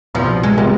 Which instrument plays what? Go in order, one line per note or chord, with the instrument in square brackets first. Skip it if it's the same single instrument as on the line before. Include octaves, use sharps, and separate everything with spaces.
[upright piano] C2 B2 B3 [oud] F3
[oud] G#3
[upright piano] C3 F3 G#3 B3 [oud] G3